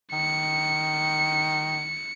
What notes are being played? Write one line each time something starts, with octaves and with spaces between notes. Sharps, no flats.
D#3 C#7